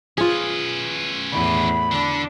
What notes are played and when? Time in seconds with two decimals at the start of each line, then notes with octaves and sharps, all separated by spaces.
0.18 C#4 F4 G#4 B4
1.33 E2 A2 B5
1.92 D3 D4